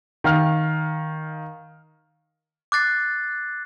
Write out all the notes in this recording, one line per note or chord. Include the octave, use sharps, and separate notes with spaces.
D#3 F5 F6
D6 F#6 A6 C7